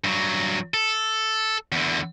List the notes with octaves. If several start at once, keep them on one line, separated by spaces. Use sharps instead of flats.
G2 F#3
A4
E2 D3